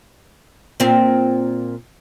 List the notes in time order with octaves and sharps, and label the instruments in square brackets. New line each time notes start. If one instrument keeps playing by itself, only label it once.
[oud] A#2 C4